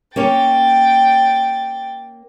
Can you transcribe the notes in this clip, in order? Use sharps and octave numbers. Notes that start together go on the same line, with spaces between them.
A#3 C#4 C#5 G5 A6